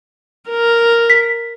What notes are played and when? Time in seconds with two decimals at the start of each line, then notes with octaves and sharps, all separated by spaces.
0.50 A#4
1.10 B6